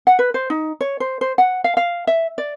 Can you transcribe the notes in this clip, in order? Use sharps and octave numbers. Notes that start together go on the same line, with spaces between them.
F#5
B4
C5
D#4
C#5
C5
C5
F#5
F5
F5
E5
D5